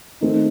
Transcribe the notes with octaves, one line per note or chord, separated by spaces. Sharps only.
D#3 A3 C4 D#4